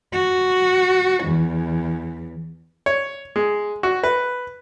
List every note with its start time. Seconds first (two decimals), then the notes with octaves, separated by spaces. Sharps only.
0.13 F#4
1.24 E2
2.86 C#5
3.36 G#3
3.83 F#4
4.04 B4